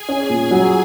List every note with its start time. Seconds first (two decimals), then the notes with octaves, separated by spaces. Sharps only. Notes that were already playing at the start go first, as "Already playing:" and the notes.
Already playing: G#4 G#5
0.09 C#4
0.30 A#2
0.51 F#3